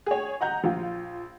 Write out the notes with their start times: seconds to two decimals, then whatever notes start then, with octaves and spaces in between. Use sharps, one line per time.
0.06 G#4 C#5
0.41 D#5 F#5 A#5 G6
0.64 A#1 F4